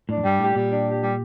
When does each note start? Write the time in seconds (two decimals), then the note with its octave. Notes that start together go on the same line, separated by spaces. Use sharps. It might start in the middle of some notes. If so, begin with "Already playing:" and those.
0.09 A2 D4
0.17 F2
0.24 G2 G3
0.39 A2 G4
0.55 A#2 G3
0.71 D4
0.87 G4
1.02 G3